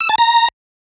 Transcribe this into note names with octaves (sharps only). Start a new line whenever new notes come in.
E6
A5
A#5